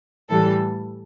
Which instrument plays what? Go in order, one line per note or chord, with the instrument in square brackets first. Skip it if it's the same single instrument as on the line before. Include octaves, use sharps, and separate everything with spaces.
[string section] A2 E3 G3 A4